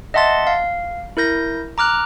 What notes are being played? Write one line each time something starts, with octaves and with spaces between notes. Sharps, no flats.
D#5 E5 F#5 A5 C6 A6
F5
E4 A#4 G6 A#6
A#5 D6 F6 F#6